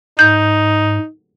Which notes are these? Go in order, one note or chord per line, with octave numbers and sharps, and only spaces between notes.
G#2 D#4 G6